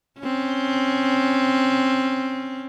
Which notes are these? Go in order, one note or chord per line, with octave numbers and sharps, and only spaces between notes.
C4 C#4